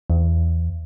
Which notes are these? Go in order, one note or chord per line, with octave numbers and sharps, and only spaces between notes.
E2